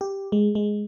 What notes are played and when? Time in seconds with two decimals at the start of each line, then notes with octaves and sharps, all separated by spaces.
0.01 G4
0.32 G#3
0.55 G#3